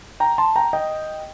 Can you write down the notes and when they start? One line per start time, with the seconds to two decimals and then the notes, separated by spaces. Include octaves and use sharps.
0.20 G5 A#5
0.38 A5 C6
0.56 G5 A#5
0.73 D#5 G5